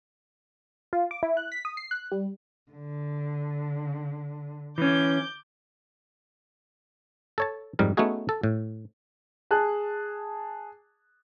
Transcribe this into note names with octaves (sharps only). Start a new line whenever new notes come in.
F4
D6
E4
F#6
B6
D#6
C7
F#6
G3
D3
E3 C#4 D6 G6
A4 C#5 A5
F2 G#2 G3 A#4
A3 B3 C#4 D#4 F#4 G#4
A4
A2
G#4 A5 F#6